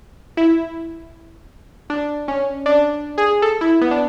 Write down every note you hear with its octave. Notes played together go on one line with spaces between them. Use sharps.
E4
D4
C#4
D4
G#4
A4
E4
B3
D4